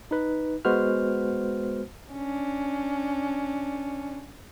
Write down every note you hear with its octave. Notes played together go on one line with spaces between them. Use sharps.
D#4 B4
G#3 B3 F#4 B4 C5 F6
C#4 D4